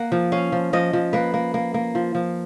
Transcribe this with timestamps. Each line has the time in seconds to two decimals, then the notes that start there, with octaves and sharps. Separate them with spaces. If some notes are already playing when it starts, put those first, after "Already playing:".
Already playing: A#3 F#5
0.12 F3
0.32 C#4 F5
0.52 F3
0.73 F3 D#5
0.93 F3
1.13 A#3 B4
1.34 A#3
1.54 A#3
1.74 A#3
1.95 F3
2.15 F3